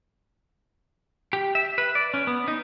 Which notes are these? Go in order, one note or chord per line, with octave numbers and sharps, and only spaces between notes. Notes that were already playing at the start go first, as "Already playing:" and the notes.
G4
E5
B4
D5
C#4
B3
D#4